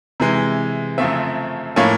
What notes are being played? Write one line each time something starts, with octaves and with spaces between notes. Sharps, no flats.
C3 E3 G#3
F#2 C#3 F3 A3 C4 E5
A2 F3 A#3 C#4